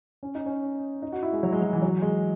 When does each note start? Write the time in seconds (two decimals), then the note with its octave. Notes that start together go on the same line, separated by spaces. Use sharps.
0.23 C#4
0.35 D#4
0.46 C#4
1.02 D#4
1.12 F#4
1.23 E4
1.32 G#3
1.43 F#3
1.53 G#3
1.62 F#3
1.73 E3
1.82 F#3
2.02 G#3